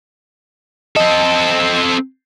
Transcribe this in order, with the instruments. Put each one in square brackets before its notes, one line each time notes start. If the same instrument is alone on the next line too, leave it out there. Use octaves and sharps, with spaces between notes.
[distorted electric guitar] C4 A4 [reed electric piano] D#5